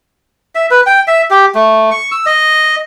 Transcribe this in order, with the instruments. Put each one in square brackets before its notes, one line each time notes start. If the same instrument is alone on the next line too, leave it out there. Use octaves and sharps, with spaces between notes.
[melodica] E5
B4
G5
E5
G4
A3
C#6
E6
D#5